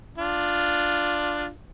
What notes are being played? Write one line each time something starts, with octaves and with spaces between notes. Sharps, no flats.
D4 F4